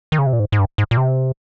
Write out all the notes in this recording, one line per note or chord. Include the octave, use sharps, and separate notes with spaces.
D#3
C#3
C3
A#2
G#2
G#2
G2
G#2
A#2
C3